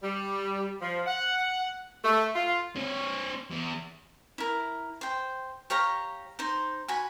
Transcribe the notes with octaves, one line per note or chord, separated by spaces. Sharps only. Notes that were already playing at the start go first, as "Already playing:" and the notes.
G3
F3
F#5
A3
F4
C4 C#5
E2
E4 A#4
C5 G5
G4 C#5 F5 A#5
D#4 C5
F#4 G#5 B5